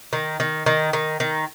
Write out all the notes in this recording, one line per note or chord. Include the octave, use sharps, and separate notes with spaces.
D#3
D#3
D#3
D#3
D#3